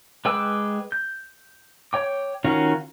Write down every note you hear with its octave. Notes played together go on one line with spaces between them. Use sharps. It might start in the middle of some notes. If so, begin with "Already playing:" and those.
G#3 B4 G5 D6 E6
G6
C#5 G5 D6
D#3 C#4 F4 F#4 F5